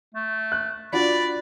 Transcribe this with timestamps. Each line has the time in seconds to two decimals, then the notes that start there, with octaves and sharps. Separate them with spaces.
0.14 A3
0.52 F#6
0.93 D4 F4 F#4 D5 B5